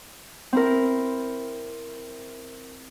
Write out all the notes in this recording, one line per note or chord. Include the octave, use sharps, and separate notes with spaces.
C4 E4 A#4